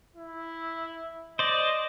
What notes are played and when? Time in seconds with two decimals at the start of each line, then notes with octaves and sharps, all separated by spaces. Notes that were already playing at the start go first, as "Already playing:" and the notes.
0.16 E4
1.39 C5 D5 D#5